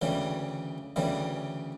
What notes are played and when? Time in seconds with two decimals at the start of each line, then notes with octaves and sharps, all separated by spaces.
0.02 D2 C#3 E3 G3
0.96 D2 C#3 E3 G3